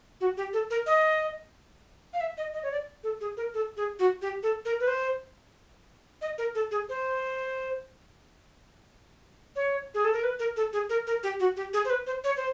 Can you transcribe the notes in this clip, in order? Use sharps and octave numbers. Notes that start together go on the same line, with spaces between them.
F#4
G4
A4
A#4
D#5
F5
E5
D#5
D#5
C#5
D5
A4
G#4
A#4
A4
G#4
F#4
G4
A4
A#4
B4
C5
D#5
A#4
A4
G#4
C5
C#5
G#4
A4
A#4
B4
A#4
A4
G#4
A#4
A#4
G4
F#4
G4
G#4
C5
B4
C5
C#5
C5